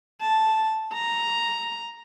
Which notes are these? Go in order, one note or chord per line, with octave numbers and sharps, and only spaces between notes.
A5
A#5